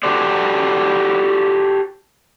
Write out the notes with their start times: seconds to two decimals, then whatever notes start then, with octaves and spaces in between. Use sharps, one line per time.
0.03 F#4 G4 A4 C5 D5